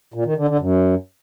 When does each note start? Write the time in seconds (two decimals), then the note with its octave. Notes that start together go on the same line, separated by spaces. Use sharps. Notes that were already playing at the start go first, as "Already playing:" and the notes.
0.14 A#2
0.25 D#3
0.37 D3
0.48 D3
0.59 F#2